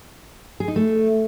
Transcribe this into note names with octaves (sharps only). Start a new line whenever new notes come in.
G#4
D#4
A3